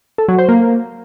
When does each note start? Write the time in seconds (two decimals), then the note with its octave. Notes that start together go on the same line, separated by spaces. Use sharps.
0.18 A4
0.28 F#3
0.39 C5
0.49 A#3